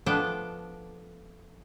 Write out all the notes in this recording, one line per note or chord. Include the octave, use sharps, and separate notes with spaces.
F3 A3 B3 D4 A4 G5